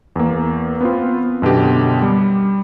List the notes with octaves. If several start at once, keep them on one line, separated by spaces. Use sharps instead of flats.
E2 A#3
B3 C4 F4
F#2 B2 D3 G4
G3